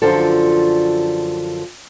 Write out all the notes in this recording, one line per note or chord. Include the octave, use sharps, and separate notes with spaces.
F#2 D3 F3 F4 A4